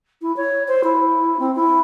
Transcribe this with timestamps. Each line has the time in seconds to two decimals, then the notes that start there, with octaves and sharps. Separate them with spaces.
0.22 E4
0.36 C#5
0.68 C5
0.83 E4
1.39 C4
1.55 E4